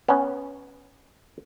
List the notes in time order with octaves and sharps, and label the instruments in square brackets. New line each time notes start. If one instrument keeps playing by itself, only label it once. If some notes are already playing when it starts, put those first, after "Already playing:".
[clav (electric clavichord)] B3 C#4